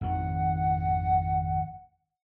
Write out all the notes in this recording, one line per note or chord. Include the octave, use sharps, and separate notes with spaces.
G#1 F2 D#3 F#5